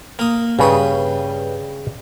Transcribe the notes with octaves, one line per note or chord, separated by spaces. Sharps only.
A#3 D#6
G2 C#3 B4 D#6